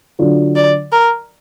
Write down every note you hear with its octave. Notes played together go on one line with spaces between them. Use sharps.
D3 F#3 D4 F4
D5
A#4